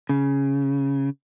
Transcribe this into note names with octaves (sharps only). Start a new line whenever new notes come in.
C#3